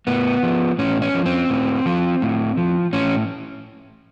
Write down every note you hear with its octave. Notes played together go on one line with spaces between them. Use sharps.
A2 B3
F3
A2 C#4
C#4
F3
C4
A2
F3
A2
F3
A2 C#4